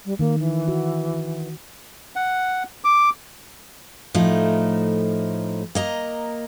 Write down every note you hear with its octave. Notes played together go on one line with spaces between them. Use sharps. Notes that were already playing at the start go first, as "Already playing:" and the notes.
G3
D#3 A#3
E3
F#4
F#5
D6
A2 F3 A3 D#4
A#3 D#5 A#5